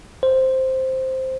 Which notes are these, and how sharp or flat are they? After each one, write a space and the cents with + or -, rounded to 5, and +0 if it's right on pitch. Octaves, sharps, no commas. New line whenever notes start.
C5 +0